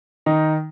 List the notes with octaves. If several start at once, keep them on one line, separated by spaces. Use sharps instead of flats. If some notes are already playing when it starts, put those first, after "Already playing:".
D#3 D#4